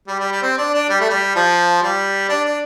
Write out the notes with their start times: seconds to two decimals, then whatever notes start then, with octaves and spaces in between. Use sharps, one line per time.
0.07 G3
0.20 G3
0.32 G3
0.42 C4
0.58 D4
0.73 D4
0.89 G3
1.00 A3
1.10 G3
1.35 F3
1.82 G3
2.29 D4
2.44 D4